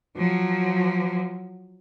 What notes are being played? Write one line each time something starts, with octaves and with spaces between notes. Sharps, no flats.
F3 F#3